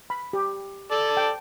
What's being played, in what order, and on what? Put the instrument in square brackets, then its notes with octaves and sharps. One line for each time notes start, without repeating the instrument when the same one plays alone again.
[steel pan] B5
G4
[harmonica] A4 D5
[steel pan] G5 A5